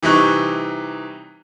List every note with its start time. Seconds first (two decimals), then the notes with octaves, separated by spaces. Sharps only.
0.03 C3 E3 G3 D#4 C#6 F#6